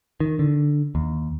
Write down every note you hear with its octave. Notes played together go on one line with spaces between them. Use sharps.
D#3
D3
D#2